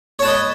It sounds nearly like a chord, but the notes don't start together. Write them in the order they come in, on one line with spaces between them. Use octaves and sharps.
C#5 A5 B4 D#5